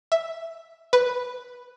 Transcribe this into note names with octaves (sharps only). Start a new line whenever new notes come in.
E5
B4